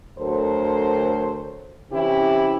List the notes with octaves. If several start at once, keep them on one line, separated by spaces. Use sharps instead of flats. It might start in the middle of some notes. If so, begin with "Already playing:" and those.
D2 F#3 A4 A#4 C5
C3 E3 C#4 E4 G4